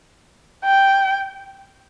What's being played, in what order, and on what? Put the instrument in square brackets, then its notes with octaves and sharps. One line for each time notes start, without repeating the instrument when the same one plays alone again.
[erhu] G5